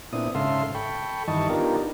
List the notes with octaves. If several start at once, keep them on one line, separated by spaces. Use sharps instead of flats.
A#2 B3 C4 D4 E4 D#6
G#2 C#3 A4 E5 F5 C6
A4 G5 B5 C#6
G2 D#3 E3 D#5 A5 C#6
B3 D4 D#4 F4 G4 A#4